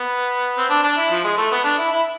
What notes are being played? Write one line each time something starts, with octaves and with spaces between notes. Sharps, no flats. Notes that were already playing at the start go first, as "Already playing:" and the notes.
Already playing: B3
C4
D4
D4
E4
F3
G#3
A3
B3
D4
E4
E4